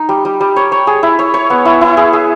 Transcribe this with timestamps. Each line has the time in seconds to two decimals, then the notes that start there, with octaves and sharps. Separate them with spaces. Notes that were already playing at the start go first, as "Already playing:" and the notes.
Already playing: D#4
0.09 G3
0.25 G3
0.41 G3
0.56 C#5
0.72 C#5
0.87 G#4
1.03 E4
1.19 C#5
1.34 C#5
1.50 B3
1.65 E4
1.81 E4
1.97 G#4
2.13 G#4